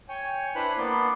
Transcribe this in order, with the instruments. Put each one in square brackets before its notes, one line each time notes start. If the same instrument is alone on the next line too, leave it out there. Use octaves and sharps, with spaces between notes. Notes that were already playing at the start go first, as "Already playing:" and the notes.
[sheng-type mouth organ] C#5 G5 G#5
D4 E4 B4 C5 B5 F#6
A#3 B3 D5 C6